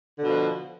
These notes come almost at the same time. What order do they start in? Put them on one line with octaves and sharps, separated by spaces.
D3 B2 F3